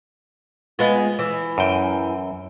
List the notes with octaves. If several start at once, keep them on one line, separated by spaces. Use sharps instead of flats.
G#3 B3 F4
E3
F#2 G5